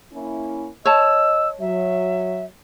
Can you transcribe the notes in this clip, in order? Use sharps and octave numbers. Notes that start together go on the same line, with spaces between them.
A#3 C#4 E4
C#5 D#5 A5 E6
F#3 E5